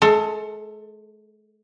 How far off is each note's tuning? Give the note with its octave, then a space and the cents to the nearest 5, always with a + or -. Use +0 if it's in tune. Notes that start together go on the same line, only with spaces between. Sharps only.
G#3 +45 A4 +20